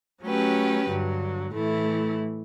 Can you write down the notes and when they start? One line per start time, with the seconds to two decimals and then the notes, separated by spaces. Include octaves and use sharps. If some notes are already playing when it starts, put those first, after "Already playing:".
0.24 F#3 A3 C#4 G4 B4
0.88 G2 D3 F#3
1.53 A2 E3 A3 E4